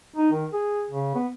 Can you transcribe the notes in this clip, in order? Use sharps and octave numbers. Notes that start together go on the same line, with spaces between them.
D#4
D#3
G#4
C#3
B3